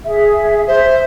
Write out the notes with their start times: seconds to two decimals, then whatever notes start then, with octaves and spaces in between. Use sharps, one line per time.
0.06 G#4 E5
0.68 C5 E5